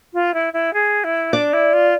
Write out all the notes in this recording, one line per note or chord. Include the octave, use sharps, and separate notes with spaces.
F4
E4
E4
G#4
E4
D4 D5
E4
F4